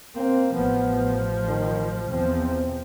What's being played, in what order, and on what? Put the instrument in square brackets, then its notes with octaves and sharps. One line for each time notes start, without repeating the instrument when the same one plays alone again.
[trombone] A#3 [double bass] C4
[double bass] A1 F3 [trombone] B3
[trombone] D#3
[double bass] E2 F3 [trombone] C4